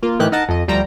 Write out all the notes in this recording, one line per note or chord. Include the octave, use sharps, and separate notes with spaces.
A#3 F4
A2 D#3 E3 G4 F#6
D#4 A#4 D#5 F#5 A5
F2 D#5
D2 F3 G3 C5 G5 A#5